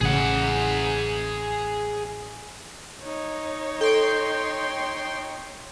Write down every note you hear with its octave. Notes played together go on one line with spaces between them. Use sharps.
A1 C#3 G#4 F#5
D#4 C#5
A4 G5 C6